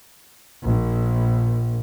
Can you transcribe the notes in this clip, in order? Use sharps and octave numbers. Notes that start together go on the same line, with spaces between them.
A#1